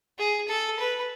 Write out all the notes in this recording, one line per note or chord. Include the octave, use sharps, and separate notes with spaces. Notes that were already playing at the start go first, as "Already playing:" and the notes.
G#4
A4
B4